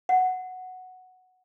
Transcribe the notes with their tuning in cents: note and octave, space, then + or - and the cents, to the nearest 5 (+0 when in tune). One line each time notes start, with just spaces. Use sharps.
F#5 +0